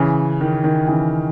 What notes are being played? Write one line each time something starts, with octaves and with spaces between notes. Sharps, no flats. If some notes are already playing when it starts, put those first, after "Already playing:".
Already playing: C#3 E3
D#3
D#3
C#3 E3